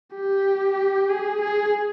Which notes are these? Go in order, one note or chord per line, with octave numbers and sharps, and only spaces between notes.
G4
G#4
G#4